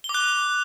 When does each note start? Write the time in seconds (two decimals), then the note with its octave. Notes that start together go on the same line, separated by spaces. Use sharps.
0.04 G7
0.09 D6
0.14 F#6